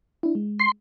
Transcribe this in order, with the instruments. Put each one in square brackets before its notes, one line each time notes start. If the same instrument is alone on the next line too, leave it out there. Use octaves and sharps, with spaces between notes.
[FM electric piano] D4 E4
G#3
[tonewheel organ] C6